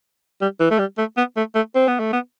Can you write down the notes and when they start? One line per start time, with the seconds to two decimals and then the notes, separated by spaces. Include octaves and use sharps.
0.41 G3
0.60 E3
0.71 A3
0.79 G3
0.98 A3
1.17 B3
1.37 A3
1.55 A3
1.75 C4
1.88 B3
2.00 A3
2.13 B3